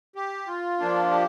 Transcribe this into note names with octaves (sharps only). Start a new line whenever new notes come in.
G4
F4
F3 A#3 D4
G4